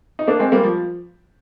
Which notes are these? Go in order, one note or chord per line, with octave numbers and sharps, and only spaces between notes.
D#4
A#3 D4
G#3 C4
G3 A#3
F3